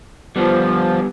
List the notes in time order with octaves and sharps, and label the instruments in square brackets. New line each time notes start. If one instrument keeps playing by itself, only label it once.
[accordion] F3 [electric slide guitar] G3 B3